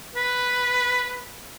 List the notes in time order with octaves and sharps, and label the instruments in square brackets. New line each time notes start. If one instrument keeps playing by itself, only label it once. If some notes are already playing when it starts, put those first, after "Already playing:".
[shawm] B4